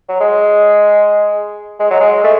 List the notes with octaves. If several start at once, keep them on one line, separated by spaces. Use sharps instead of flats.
F#3
G#3
G#3
F#3
G#3
A3